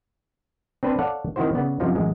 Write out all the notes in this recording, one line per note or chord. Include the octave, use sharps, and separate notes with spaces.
C4 D4 B4 C5
A4 C#5 D5 F5 F#5 A5
D#3 C4 E4 F#4 C5
C#3 B3 D5
F#2 C3 F3 D#4
A1 F#2 G#3